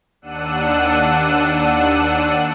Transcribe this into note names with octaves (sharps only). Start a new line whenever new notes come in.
D#2 D4 F#5 E6 F#6 D#7